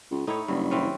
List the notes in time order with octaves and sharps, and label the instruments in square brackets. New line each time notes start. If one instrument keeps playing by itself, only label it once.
[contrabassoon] C#2
[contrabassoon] A2 [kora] D#4 E4 C#5
[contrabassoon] F#1 [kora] G2
[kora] E3 C4 C#4